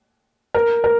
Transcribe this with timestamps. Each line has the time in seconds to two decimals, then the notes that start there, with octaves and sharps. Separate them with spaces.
0.54 A#4
0.84 A#4